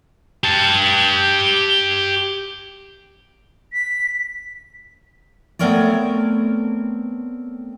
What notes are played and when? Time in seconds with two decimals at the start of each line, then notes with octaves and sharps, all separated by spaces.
0.44 G4 A5
3.73 B6
5.59 A3 B3 C4 A#4 C#5 D5